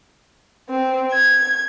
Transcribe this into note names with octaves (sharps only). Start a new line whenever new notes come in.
C4
G#6